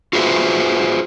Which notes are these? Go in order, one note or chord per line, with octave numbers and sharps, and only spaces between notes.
F4 F#4 G#4 B4 C5 E5